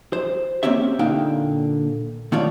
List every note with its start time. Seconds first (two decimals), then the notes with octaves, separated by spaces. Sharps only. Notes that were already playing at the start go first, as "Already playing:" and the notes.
0.13 C5
0.63 A#3 C4 C#4 G4 E5
0.99 A#2 D3 A#3 D#4 F5 G5
2.32 D#3 A3 F4 C#5 D5